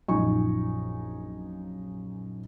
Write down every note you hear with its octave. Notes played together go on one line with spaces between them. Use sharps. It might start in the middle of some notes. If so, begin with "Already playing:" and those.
A#1 F#2 F3 D#4 G#5 C#6